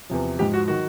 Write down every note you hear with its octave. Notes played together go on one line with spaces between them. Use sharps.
E2 C3 F3
G#2 F3 G4
F#4
D#3 F#3 F#4